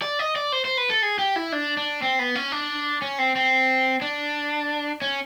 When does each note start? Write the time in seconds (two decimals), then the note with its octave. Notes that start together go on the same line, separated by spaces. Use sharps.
0.02 D5
0.19 D#5
0.36 D5
0.52 C5
0.65 C5
0.77 B4
0.90 A4
1.02 G#4
1.19 G4
1.36 E4
1.52 D4
1.77 D4
2.02 C4
2.19 B3
2.35 C#4
2.52 D4
3.02 C#4
3.19 C4
3.36 C4
4.02 D4
5.02 C#4